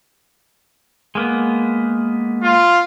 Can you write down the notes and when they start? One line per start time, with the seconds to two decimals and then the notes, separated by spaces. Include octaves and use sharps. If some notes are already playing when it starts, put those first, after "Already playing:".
1.15 G#3 A#3 B3
2.43 F4